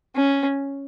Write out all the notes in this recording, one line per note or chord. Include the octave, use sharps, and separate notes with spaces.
C#4